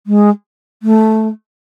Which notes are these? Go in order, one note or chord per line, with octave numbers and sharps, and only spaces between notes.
G#3
A3